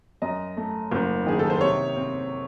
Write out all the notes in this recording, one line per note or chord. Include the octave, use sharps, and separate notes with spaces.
F#2 D#5
A3
F#1
D#3 G#4
A4
C5
C3 C#5
C4